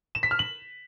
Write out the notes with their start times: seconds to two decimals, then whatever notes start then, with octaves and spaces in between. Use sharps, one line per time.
0.15 E7
0.23 B6
0.31 F6
0.39 F#7